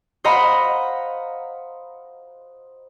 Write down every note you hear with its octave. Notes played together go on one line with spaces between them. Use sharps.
C5 D#5 F5 F#5 A#5 B5